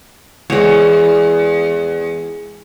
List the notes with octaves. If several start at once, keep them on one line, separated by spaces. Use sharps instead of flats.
E2 G#3 C#5